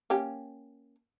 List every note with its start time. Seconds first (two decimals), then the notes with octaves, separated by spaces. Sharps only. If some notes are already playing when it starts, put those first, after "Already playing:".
0.10 A#3 C#4 G4